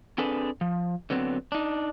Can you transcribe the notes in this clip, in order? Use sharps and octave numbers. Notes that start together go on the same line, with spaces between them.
C4 D4 G#4 A4 B4
F3
D3 F#3 B3 C4
D4 D#4